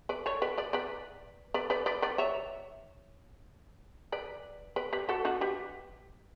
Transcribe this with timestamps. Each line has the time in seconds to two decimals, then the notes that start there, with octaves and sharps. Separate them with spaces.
0.09 B4 D5
0.26 A4 C#5
0.42 B4 D5
0.58 B4 D5
0.73 B4 D5
1.54 B4 D5
1.70 B4 D5
1.86 B4 D5
2.02 B4 D5
2.18 C#5 E5
4.12 B4 D5
4.76 B4 D5
4.93 G4 B4
5.09 F#4 A4
5.25 D4 F#4
5.41 G4 B4